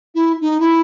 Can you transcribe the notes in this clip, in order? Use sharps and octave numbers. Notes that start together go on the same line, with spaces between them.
E4
D#4
E4